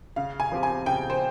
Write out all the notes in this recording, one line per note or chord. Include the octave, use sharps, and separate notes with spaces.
C#3 F5
G#5
F3 C4 G4
G#5
C#3 G5
C5